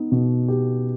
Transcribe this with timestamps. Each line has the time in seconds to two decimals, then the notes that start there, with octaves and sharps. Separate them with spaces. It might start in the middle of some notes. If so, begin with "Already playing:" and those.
Already playing: B3 D#4
0.12 B2
0.48 G4